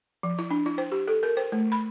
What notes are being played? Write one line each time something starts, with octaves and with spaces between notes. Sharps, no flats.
F3
E4
D4
E4
C5
G4
A4
A#4
C5
A3
B5